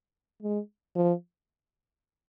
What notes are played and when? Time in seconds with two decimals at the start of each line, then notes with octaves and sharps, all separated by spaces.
0.43 G#3
0.96 F3